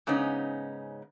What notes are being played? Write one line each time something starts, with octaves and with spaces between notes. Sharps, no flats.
G#2 C#3 B3 C#4 D#4